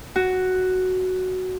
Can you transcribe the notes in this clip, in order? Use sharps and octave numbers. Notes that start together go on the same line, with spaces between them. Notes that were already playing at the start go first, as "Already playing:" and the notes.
F#4